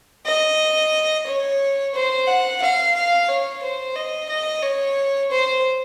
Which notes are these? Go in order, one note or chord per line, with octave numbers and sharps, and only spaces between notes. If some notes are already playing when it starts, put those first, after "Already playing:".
D#5
C#5
C5
F#5
F5
F5
C#5
C5
D#5
D#5
C#5
C5